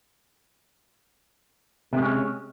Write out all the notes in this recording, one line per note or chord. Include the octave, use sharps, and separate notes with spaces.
C3 G#3 C#4